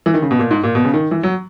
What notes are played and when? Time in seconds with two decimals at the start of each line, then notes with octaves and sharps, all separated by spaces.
0.06 E3
0.14 D#3
0.22 C#3
0.31 B2
0.39 A#2
0.51 G#2
0.63 A#2
0.75 B2
0.85 C#3
0.94 D#3
1.11 E3
1.23 F#3